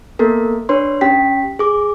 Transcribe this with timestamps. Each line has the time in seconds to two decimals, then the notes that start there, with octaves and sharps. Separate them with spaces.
0.19 A#3 B3 A4 A#4
0.69 D4 B4 C#5 C6
1.01 C#4 G4 G5 B6
1.59 G#4 D6